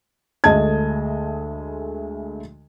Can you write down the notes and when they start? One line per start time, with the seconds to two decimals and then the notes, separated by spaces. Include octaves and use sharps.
0.44 D2 G#3 A3 D#5 A5 G#6